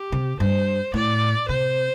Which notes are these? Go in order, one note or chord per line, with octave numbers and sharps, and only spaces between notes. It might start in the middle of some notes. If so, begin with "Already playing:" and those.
Already playing: G4
C3
G2 C5
A2 D5
C3 C5